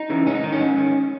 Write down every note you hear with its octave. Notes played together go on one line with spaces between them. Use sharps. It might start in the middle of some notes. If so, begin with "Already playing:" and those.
Already playing: D#4
C#3 E3
G#2 C#4
D#4
D#3
C#4
G#2
D#3